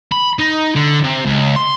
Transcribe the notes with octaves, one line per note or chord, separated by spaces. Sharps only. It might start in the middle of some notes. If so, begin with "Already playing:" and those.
B5
D#4
D3
C3
C#2
C6